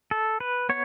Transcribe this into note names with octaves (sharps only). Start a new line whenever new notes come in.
A4
B4
B3 C#5